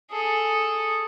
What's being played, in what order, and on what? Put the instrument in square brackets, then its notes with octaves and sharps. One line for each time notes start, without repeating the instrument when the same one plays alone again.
[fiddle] G#4 A4